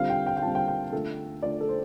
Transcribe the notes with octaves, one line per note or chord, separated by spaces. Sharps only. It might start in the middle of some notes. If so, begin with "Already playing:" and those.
Already playing: D3 G3 C4 F4 F5
G5
G5
G5
D3 G3 C4 F4 A5
G5
G5
D3 A3 F4 A4
D3 A3 F4 D5
A4
C5